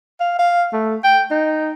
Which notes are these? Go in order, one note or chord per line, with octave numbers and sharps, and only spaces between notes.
F5
F5
A3
G5
D#4